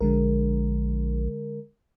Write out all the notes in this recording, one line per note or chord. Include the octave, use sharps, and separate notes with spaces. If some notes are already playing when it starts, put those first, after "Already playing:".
A#1 D3 G#3 A#4